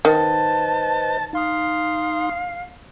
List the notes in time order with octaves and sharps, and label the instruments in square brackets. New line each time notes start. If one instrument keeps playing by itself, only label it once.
[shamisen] D#3 [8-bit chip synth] B4 C5 D#5 [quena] A5
[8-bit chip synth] D#4 C6 D#6 [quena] F5